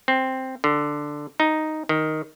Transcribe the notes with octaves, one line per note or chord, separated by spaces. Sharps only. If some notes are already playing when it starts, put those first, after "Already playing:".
C4
D3
D#4
D#3